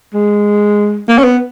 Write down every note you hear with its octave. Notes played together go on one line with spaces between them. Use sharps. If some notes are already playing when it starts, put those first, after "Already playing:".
G#3
A#3
C#4
B3